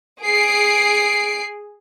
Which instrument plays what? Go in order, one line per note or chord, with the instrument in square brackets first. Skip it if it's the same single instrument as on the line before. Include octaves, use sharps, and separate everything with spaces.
[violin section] G#4 C7 D7